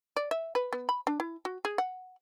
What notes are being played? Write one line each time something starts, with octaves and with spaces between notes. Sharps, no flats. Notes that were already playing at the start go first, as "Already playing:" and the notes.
D5
E5
B4
B3
B5
D4
E4
F#4
G#4
F#5